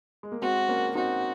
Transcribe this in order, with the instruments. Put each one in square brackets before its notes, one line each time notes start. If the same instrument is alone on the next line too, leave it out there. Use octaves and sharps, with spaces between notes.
[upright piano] G#3
A#3
[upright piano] G#3 C4 [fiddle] F#4
[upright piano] A#3 C#4
[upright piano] C4 D#4 [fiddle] F#4